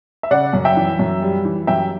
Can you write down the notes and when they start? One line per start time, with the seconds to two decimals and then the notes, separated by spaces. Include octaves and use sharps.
0.23 E5
0.31 C#3 D5 F#5
0.53 F#2
0.65 E5 G5
0.77 E3
0.99 F#2
1.22 G3
1.45 E3
1.67 F#2 E5 G5